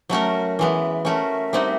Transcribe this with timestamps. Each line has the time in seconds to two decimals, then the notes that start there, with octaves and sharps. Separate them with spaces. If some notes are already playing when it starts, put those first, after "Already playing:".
0.09 F#3 A3 C#4 F#4 A#4 E5
0.59 E3 G#3 B3
1.05 A3 C#4 F#4 A#4 E5
1.53 G3 C4 D#4 F#4